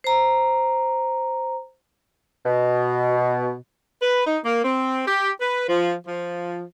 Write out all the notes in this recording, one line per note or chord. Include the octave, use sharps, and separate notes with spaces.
C5 A#5
B2
B4
D#4
A#3
C4
G4
B4
F3
F3